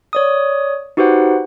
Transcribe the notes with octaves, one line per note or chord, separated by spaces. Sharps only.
C#5 D5 D#6
D#4 F#4 G4 B4 C5 F#5